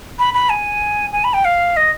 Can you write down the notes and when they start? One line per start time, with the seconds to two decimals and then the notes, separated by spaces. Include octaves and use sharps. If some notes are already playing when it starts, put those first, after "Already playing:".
0.19 B5
0.34 B5
0.50 G#5
1.13 G#5
1.24 B5
1.34 G5
1.45 F5
1.77 D#5